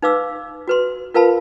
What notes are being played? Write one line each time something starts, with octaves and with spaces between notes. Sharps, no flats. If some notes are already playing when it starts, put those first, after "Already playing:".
D#4 B4 F5 D6 E6
F#4 B4 C6
F4 A#4 B4 F5 A5 B5